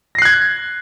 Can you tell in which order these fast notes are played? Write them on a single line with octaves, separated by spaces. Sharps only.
A#6 C7 F#6 G#6